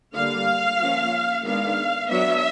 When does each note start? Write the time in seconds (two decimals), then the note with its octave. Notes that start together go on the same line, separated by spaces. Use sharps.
0.15 D3 G3 A#3 F5
0.80 F3 A#3 C#4
1.45 D#3 G#3 B3 D4 F5
2.10 F#3 B3 D4 E5